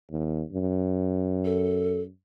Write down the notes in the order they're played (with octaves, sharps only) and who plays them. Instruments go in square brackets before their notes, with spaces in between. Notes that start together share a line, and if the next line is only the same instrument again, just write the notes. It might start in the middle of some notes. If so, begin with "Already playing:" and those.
[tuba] D#2
F#2
[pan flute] A4